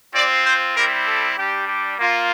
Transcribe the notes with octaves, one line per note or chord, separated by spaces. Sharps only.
C4 F4 D5
C5
G3 C4 E4 G4 A#4
A4
G3 D4 G4
G4
A#3 F4